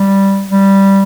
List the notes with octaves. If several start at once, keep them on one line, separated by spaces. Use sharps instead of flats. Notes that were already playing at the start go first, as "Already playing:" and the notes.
Already playing: G3
G3